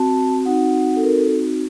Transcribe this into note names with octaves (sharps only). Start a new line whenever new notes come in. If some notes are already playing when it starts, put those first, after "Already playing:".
Already playing: C4 F#4 A5
C4 D#4 F#4 F#5
A4
A#4
A4